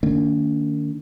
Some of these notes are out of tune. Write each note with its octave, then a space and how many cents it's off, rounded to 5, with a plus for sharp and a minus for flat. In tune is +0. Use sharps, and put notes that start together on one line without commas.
D#3 -35 A#3 -40 D4 -45